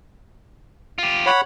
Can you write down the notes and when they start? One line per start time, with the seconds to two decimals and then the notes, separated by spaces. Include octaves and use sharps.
0.98 F4 G4
1.26 C#5 F#5 B5